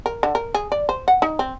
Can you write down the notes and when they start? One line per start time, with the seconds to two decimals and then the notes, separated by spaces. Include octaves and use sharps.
0.06 A#4
0.23 D3
0.35 A#4
0.55 G#4
0.72 D5
0.89 C5
1.08 F#5
1.22 D#4
1.39 C4